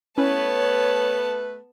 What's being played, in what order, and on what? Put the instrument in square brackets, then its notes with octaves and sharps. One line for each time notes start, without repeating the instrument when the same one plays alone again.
[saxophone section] A3 B4 [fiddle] B3 A5 [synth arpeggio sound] C#4 E4 [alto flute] C#5